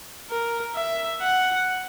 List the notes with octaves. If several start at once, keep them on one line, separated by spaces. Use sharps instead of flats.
A#4
E5
F#5